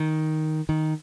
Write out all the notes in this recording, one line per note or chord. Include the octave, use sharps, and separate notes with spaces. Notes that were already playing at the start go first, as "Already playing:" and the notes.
Already playing: D#3
D#3